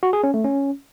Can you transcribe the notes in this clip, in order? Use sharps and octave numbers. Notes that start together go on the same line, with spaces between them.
F#4
G#4
C#4
A3
C#4